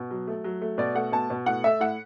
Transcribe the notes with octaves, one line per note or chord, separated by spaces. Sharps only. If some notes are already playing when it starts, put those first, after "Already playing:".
Already playing: B2
F#3
A3
F#3
A3
B2 D5
A3 F#5
B2 A5
B2
A2 F#5
A3 E5
A2 F#5